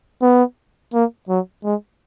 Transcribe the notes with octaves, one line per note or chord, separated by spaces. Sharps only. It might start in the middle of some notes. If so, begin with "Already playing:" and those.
B3
A#3
F#3
G#3